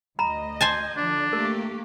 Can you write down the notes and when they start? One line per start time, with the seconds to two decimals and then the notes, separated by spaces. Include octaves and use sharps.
0.19 D2 D#5 A#5 B5
0.61 C5 G#5 A5
0.97 D3 F3 D4
1.33 A3 A#3 G4 A#4